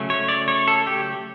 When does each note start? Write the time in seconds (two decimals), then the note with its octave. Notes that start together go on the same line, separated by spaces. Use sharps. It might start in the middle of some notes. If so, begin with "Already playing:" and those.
Already playing: C#3 F#3 A3 C#4
0.10 C#5
0.29 D5
0.48 C#5
0.68 A4
0.87 G4